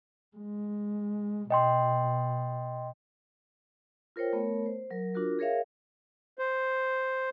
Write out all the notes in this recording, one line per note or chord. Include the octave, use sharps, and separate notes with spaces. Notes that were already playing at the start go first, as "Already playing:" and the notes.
G#3
B2 D#5 G5 C6
F4 A#4 C5 C#5 G5
A3 B3 A#4 C#5
C5
F#3 A#4
D4 F4 F#4 A#4
G#4 A#4 C#5 E5 F5
C5